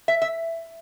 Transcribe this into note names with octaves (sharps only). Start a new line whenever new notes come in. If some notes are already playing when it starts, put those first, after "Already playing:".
E5
E5